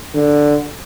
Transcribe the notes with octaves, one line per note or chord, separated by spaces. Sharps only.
D3